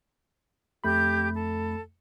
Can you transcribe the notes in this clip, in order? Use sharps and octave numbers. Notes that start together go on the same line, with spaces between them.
F2 A3 G4 B5 G6
A4